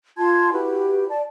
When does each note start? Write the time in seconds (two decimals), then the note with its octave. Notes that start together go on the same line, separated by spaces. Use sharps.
0.17 F4 A5 C6 G#6
0.52 E4 F#4 G4 B4
1.09 D5 A5